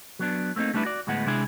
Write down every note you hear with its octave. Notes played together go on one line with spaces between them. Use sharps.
F#3 B3 D4
A3 A#3 C4 D#4
G3 A3 B3 D4 E4 B4
F#4 D5
D2 A2 G#3 B3 F#5
C3 G#3 D4 E4 G#4